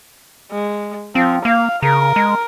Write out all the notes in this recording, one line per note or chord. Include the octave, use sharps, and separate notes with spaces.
G#3
F3 C4
A#3 F5
C#3 A#4
G#3